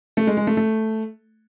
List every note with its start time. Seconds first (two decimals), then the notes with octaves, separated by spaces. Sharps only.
0.17 A3
0.27 G#3
0.37 G#3
0.47 A3
0.57 A3